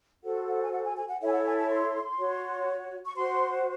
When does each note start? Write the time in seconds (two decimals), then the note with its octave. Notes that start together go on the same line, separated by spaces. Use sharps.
0.23 F#4 A4 C5 F#5
0.48 F#5
0.63 G#5
0.72 F#5
0.84 G#5
0.96 G#5
1.09 F#5
1.21 E4 A4 C#5 E5
1.27 G#5
1.33 F#5
1.45 G#5
1.58 A5
1.70 C6
2.18 F#4 C#5
3.06 C#6
3.16 F#4 C5 C6